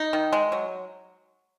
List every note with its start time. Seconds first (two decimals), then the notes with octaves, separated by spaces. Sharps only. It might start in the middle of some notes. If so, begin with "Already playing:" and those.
Already playing: D#4
0.13 D#3
0.33 G#3
0.52 F#3